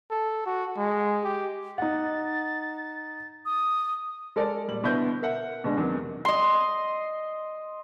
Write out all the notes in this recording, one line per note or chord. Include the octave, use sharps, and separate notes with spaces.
A4
F#4
G#3
G4
D#4 F#5 A6
D#6
G#3 A4 A#4 D5
D#1 G3 F#7
B2 D3 B3 E4 C5 G6
A#4 E5 F#5
B2 D3 G#3 D4
E2 C3 D#3 F#3
D#5 C6